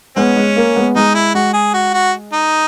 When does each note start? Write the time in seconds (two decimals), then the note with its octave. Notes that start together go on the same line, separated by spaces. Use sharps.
0.16 G#3 B3 C#4
0.36 G#3
0.56 A#3
0.76 G#3 B3
0.96 G#3 D#4
1.15 E4
1.34 G#3 F#4
1.53 G#4
1.73 F#4
1.94 F#4
2.33 D#4